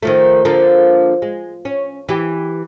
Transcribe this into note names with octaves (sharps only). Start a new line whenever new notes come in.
D#3 F3 A3
D3 F3 A#3
G#3
C#4
E3 G4